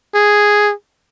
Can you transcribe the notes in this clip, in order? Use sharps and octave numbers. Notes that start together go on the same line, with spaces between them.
G#4